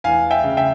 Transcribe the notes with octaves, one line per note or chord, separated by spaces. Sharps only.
E2 F5 G#5
E5 G5
C#3
E5 G5